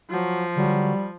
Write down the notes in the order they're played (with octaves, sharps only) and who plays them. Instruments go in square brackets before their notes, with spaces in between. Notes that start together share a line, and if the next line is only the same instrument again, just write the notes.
[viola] F3 [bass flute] F#3
[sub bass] D3 [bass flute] F#3 [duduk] G3